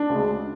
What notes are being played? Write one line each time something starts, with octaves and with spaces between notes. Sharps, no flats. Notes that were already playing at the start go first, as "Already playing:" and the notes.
Already playing: D4
D2 C#3 G#3